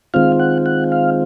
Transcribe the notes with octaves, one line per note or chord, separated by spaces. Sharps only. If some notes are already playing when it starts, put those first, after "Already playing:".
D#3 G#3 C4 F4 F5
F#5
F#5
F5